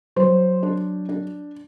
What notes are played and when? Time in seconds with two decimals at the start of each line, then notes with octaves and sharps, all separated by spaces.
0.16 F#3 C5
0.63 D4
1.09 D4